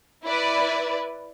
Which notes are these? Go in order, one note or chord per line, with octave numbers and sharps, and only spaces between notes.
E4 B4 D5